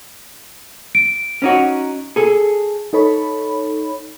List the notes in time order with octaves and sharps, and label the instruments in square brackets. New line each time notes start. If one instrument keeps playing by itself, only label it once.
[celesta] D7
[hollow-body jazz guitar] C#4 D#4 F#4
G#4 A4
[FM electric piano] D#4 A4 C#5 B5